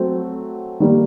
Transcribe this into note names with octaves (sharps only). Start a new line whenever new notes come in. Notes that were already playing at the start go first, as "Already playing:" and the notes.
Already playing: F#3 A3 C4
D#3 G3 A#3